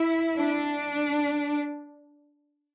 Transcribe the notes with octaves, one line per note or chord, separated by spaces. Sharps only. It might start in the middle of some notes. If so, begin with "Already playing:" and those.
Already playing: E4
D4